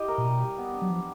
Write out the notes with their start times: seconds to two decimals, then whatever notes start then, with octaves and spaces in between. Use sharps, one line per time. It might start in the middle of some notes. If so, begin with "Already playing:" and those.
Already playing: E4 G4 D#5
0.08 A#4
0.18 A#2
0.24 B2 G3
0.41 G3
0.58 B3
0.73 D4
0.82 F#3
0.90 F3 G3